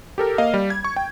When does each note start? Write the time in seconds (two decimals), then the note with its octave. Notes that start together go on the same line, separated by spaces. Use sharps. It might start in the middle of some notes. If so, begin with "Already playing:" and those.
0.18 G4 A4 A#4
0.38 A#3 D#5 F5
0.54 G3
0.70 G#6
0.84 C#6
0.96 G5